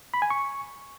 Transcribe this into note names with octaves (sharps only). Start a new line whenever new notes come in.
B5
G#5
C#6